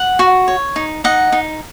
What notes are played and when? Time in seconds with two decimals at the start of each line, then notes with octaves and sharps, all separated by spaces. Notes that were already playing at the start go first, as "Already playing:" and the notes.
Already playing: F#5
0.19 F#4
0.48 C#5
0.76 D#4
1.04 D#4 D#5 F#5
1.32 D#4